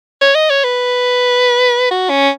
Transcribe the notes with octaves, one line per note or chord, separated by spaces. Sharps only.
C#5
D#5
C#5
B4
F#4
C#4